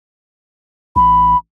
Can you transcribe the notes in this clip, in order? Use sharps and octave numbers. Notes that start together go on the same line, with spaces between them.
A1 B5